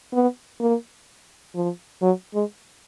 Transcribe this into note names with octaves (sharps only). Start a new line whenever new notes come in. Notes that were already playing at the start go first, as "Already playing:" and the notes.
B3
A#3
F3
F#3
G#3